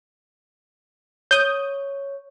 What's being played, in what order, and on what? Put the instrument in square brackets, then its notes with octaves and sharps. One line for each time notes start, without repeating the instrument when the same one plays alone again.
[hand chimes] C#5 [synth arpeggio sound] D#6 G6